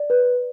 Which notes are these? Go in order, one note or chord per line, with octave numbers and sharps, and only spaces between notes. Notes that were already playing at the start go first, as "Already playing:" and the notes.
Already playing: D5
B4